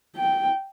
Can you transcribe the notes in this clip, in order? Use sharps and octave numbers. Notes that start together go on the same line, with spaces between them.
G5